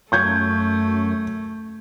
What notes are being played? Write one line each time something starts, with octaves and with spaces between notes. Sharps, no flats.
F#2 A3 C#6 G6 G#6